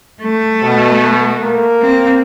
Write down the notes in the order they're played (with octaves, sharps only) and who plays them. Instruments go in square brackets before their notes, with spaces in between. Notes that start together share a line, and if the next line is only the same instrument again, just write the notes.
[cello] A3
[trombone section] B2
A#3 A#4
[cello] C4